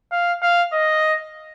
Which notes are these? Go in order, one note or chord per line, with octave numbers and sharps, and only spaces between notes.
F5
F5
D#5